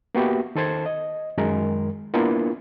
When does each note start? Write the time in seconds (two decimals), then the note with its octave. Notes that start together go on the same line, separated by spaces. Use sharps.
0.15 A#3 B3 F#4 G4 E5
0.55 D#3 A4 C5 A5 G#6
0.86 D#5
1.38 F#2 D#3 G#3 A#4
2.14 A#3 B3 D4 E4 F4 A#4